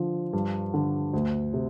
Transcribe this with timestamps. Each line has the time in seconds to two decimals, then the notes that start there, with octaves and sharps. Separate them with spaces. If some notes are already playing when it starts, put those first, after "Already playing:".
Already playing: D3 F3
0.33 G2
0.74 D3
1.13 D2
1.53 C3